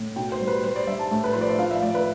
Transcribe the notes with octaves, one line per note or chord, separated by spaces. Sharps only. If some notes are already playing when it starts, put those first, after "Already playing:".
Already playing: A2
B2 G5
C5
G3
B4
G3 C5
D5
G3 E5
A5
A2
B4
F3 C5
D5
E5
F3 F5
E5
A2 D5
B4